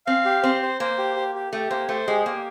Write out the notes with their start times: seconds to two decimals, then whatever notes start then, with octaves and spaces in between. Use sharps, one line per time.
0.07 C4 F5
0.25 G4
0.43 C4 C5
0.62 C5
0.80 A#3 C5
0.99 G4
1.16 G4
1.35 G4
1.53 A3 G4
1.70 A#3 C5
1.89 A3 C5
2.08 G#3 G4
2.26 A#3 G4